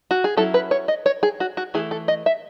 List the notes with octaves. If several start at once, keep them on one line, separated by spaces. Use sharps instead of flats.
F#4
G#4
F#3 C#4 E4 A4
B4
C#5
D#5
C#5
G#4
F#4
F#4
E3 A3 E4 G#4
A4
D#5
E5